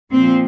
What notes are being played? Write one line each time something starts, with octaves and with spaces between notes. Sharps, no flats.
A#2 F3 C4